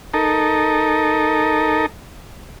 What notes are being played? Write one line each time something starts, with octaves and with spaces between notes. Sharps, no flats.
D#4 A4 A#4